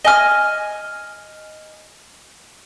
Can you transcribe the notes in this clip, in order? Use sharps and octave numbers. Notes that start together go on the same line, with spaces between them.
D#5 G#5 F6